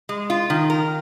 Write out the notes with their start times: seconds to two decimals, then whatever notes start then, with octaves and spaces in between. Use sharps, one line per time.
0.09 G#3
0.30 F4
0.50 D#3
0.70 A#4